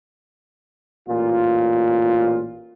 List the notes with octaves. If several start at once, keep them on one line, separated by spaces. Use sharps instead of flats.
A1 A#2 F4